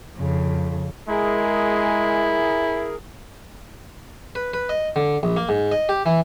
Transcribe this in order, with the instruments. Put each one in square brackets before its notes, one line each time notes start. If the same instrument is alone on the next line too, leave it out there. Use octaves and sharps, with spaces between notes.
[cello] F2 C#3
[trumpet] G#3 [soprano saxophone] E4 [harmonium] G#4 A#4
[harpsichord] B4
B4
D#5
D3
A#1
A#3
G#2
D#5
G4
E3